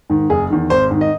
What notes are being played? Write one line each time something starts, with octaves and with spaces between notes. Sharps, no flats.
G#2 D#3
F#1 G#4
E2 D#3
G#1 C5
G#2 D#3
D#5